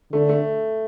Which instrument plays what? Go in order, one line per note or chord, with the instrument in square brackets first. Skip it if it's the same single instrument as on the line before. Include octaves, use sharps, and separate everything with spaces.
[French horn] D3 [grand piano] A3
[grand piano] A3